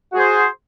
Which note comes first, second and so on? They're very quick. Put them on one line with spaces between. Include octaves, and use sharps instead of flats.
F#4 G#4 C5